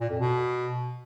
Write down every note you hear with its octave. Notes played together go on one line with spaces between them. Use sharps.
A#2
F2
B2